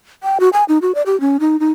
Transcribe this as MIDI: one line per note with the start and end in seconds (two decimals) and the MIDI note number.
0.23 0.38 79
0.40 0.49 66
0.53 0.64 80
0.69 0.78 63
0.82 0.95 66
0.95 1.02 74
1.06 1.19 67
1.21 1.37 61
1.40 1.59 63
1.60 1.71 63